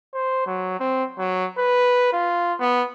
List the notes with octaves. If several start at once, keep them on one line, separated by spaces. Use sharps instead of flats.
C5
F#3
C4
F#3
B4
F4
B3